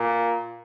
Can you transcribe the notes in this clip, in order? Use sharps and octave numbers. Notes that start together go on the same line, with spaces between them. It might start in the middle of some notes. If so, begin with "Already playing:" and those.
Already playing: A#2